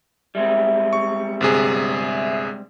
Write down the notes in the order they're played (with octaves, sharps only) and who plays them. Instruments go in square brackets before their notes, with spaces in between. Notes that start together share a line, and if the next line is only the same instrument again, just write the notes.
[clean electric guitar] G3 G#3 C4 [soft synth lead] E5
[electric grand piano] C#6
G1 C3 G#4